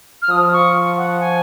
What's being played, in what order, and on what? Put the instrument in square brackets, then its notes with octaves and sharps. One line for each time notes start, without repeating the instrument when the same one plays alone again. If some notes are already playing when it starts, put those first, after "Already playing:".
[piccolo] F6
[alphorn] F3 [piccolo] D#6
[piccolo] C#6
F#5
G#5